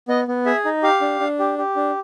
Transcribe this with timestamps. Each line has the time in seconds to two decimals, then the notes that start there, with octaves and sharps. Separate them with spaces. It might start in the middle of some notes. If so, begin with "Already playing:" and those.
0.08 B3 D#5
0.28 B3
0.45 G#4 E5
0.65 D#4
0.83 G4 F5
1.01 D4
1.20 D4
1.39 G4
1.58 G4
1.76 D4